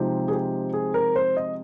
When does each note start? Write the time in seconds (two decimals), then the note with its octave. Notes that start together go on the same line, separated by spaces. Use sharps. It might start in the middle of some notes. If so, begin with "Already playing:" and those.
Already playing: C3 F3 G#3 C4 D#4 G4
0.28 G#4
0.31 G4
0.73 G#4
0.94 A#4
1.16 C5
1.37 D#5